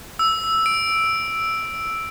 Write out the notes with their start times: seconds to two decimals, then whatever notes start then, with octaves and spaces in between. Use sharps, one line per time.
0.19 E6
0.66 D7